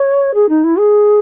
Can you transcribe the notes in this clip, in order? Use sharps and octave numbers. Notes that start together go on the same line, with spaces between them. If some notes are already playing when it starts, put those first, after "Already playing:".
Already playing: C#5
G#4
D#4
E4
G#4